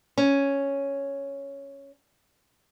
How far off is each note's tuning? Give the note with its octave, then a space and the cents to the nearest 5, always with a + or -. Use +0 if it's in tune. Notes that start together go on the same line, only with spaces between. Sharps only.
C#4 +0